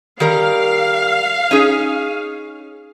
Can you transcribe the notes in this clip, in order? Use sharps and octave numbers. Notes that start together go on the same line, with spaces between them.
D#3 G3 A#4 F5
C#4 D#4 G#4